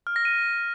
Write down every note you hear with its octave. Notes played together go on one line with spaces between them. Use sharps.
F6
A#6
D#7